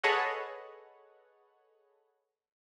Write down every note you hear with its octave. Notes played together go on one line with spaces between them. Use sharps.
G#4 A4 B4 C#5 D#5 F#5